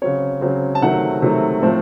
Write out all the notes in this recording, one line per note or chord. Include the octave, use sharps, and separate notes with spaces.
C#3 F#3 C4 C#5
C#3 F#3 C4
A5
C3 D#3 F#3 A3 F#5
C3 D#3 F#3 A3
A2 F3 A3 C4